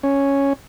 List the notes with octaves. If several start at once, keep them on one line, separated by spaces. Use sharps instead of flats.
C#4